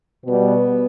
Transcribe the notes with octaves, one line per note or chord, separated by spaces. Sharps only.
B2 G3 B3